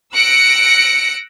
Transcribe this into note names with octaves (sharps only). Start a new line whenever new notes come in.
E6 F#6 A#6 C#7 D7